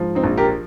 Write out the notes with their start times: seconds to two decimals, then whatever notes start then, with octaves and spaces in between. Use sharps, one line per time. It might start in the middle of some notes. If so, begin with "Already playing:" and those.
Already playing: G#2 F3
0.15 C4 D#4
0.23 A#1
0.37 G4 A#4